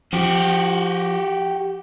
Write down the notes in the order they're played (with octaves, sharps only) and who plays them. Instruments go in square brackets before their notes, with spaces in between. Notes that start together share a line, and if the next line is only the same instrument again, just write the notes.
[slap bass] F3 [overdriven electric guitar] F#4 G4